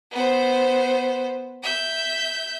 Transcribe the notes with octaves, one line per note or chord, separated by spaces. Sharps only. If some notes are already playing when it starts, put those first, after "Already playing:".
B3 C5
E5 G6